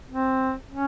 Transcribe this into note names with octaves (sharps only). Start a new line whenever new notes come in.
C4
C#4